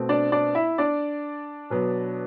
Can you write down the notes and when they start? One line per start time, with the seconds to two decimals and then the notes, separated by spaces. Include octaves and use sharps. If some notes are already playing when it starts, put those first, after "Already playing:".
Already playing: B2 A3 C4
0.09 D4 D5
0.32 D4 D5
0.55 E4 E5
0.78 D4 D5
1.70 B2 F#3 B3